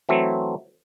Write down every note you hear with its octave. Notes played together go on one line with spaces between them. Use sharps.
E3 F#3 A3 C4